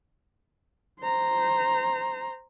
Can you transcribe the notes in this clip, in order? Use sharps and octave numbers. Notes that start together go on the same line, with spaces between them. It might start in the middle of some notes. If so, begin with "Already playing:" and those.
C5 A#5